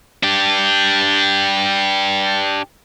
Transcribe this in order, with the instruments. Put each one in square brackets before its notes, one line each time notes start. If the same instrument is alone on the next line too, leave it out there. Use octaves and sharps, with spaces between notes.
[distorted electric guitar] D4 G4